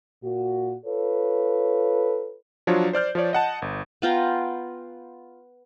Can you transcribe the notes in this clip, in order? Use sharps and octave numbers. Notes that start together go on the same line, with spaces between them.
A#2 F#4
F4 A4 B4 C#5
F3 F#3 D4 F4 C#5
C5 D5 F6 G6
F3 F4 C#5 D5
D#5 F#5 A5
G1
B3 F4 G5 A#5